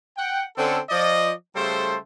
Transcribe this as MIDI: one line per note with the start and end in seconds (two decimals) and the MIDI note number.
0.17 0.43 78
0.17 0.43 79
0.57 0.78 50
0.57 0.78 60
0.57 0.78 61
0.57 0.78 69
0.89 1.31 53
0.89 1.31 74
0.89 1.31 75
1.56 1.97 49
1.56 1.97 55
1.56 1.97 57
1.56 1.97 69
1.56 1.97 72